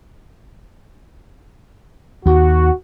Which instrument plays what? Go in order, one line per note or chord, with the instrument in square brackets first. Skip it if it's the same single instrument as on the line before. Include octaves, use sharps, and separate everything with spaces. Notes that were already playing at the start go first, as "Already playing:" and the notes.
[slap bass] D#2 [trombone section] F#4